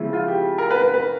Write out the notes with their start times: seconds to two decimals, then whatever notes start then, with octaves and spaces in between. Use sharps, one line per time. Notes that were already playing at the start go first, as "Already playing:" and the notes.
Already playing: C#3 F3 G#3 B3 E4
0.13 F4
0.28 G4
0.58 A#4
0.71 B4
0.82 B4
0.94 B4